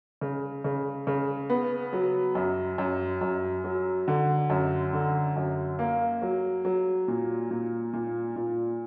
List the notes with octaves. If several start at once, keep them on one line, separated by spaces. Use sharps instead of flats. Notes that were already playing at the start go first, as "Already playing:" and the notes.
C#3
C#3
C#3
B3
F#3
F#2
F#2
F#2
F#3
D3
F#2
D3
F#2
A#3
F#3
F#3
A#2
A#2
A#2
A#2